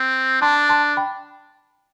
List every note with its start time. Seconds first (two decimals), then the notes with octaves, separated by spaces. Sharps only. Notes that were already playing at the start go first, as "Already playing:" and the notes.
Already playing: C4
0.42 D4 A5 C6
0.69 A5 C6
0.97 G5 B5